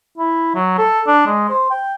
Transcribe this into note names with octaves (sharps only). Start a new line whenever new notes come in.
E4
F#3
A4
D4
G#3
C5
G5